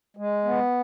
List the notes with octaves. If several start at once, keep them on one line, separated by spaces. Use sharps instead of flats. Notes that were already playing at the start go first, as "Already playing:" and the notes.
G#3
B3